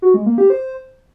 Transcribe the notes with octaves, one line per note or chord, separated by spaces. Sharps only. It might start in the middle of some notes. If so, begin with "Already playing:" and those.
F#4
G#3
A#3
G4
C5